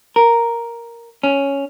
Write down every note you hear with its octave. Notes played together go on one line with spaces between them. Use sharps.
A#4
C#4